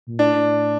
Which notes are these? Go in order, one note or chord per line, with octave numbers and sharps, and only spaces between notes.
A#2
A2 D4